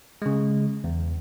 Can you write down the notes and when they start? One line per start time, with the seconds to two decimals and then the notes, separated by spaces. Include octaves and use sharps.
0.22 C#3 G#3
0.84 E2